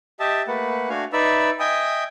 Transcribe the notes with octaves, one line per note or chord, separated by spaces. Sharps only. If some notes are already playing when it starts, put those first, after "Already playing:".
G4 D#5 E5 A5
A3 A#3 B4 F#5
A3 D4 F#4 F5 G#5
D#4 B4 D5 E5 E6
D#5 E5 G5 G#5 D#6